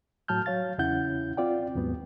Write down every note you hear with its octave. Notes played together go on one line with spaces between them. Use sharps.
A2 F#3 A5 F6 G6
F#3 C#5 F5 A6
E2 C#3 C#4 E4 F#5 G6
C4 F4 D5 G5
D#2 G#2 F#3 B3